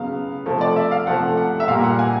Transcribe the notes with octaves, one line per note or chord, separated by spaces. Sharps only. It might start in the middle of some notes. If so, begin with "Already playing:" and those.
Already playing: C#3 F#3 B3 F5
C3 F3 A3
D5
E5
F5
C3 F3 A3 F#5
F#5
E5
A#2 G3 A#3 F5
F#5
G#5